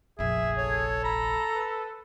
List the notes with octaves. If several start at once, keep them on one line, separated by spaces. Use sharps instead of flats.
F1 A#1 G#4 E5
A4 C#5
A#5 B5
B4